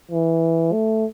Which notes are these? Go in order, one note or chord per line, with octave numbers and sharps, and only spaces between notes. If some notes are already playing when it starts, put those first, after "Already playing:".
E3
A3